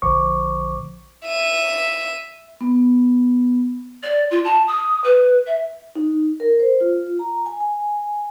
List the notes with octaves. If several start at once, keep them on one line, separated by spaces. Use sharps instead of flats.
A#1 D3 F3 C5 C#6 D6
E5 D#7
B3
D5
F4
A5
D#6
B4
E5
D#4
A#4
C5
F4
A#5
G#5
G#5